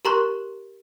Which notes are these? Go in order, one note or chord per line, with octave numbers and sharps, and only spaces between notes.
G4 A#4 A#5 C6 C#6 F#6